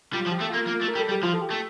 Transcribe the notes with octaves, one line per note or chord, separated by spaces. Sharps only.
G3 F4
F3
G4
A3
A#3 F4
A#3
A3
A#4
G3
A4
G3
G4
F3 F4
A4
G4
A3